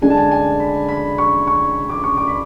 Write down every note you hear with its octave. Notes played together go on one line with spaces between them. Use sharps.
D3 G#3 D4 G#5
A5
G#5
G#5
B5
B5
C#6
C#6
D6
C#6
D6
B5